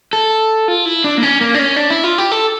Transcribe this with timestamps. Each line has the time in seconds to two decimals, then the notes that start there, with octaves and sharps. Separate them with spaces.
0.13 A4
0.68 F4
0.86 E4
1.04 D4
1.18 A#3
1.23 C#4
1.41 A#3
1.55 D4
1.59 C#4
1.76 D4
1.90 E4
2.04 F4
2.18 G4
2.32 A4